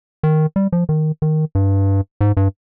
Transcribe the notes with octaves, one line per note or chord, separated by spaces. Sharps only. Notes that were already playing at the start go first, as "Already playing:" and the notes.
D#3
G3
F3
D#3
D#3
G2
G#2
G2